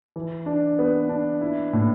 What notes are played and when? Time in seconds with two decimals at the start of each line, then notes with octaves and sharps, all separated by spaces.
0.16 E3
0.46 D4
0.79 B3
1.09 D4
1.41 E4
1.73 A2